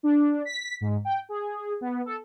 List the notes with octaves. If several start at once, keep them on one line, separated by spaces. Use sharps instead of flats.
D4
B6
G#2
G5
G#4
B3
A4